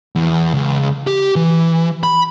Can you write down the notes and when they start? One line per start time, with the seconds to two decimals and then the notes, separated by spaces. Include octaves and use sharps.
0.16 E2
0.54 C#2
1.07 G4
1.36 E3
2.03 B5